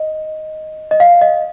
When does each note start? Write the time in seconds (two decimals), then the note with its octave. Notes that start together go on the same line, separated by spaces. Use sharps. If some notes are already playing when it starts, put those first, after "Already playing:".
Already playing: D#5
0.91 D#5
1.00 F5
1.21 D#5